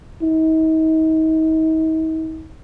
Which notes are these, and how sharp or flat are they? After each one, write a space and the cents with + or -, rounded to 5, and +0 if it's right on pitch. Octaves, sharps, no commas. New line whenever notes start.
D#4 +40